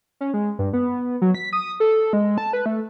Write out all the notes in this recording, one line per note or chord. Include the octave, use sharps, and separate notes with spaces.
C#4
G#3
G2
B3
F#3
B6
D#6
A4
G#3
A5
B4
A3